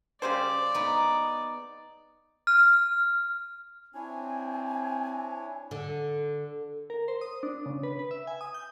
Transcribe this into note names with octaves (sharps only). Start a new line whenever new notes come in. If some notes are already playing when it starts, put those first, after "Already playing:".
C#3 G3 C5 D5
B3 D#4
F6
C4 D4 E4 C#5 G#5
D3
A#4
C5
D#6
D4
C#3
B4
B4
E5
G#5
D#6
G6